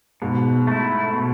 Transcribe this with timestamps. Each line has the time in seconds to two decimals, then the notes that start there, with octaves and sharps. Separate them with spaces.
0.22 G#2 B2
0.67 A3 E4
1.13 B2